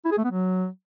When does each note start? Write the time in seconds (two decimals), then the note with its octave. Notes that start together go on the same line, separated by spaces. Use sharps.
0.05 E4
0.12 G#4
0.18 A3
0.24 B3
0.31 F#3